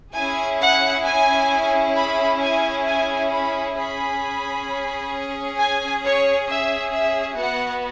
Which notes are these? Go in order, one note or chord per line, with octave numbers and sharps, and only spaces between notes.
C#4 E4 G#4 G#5
F#5
G#5
B5
G#5
G#5
B5
C#4 G#4 B5
G#5
C#5
E5
E5
B3 F#4 F#5